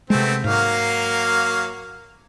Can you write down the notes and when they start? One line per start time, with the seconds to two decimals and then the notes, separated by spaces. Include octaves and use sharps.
0.10 C3 G#3 A3 B3 C4
0.44 G#2 F#3 A#3 F5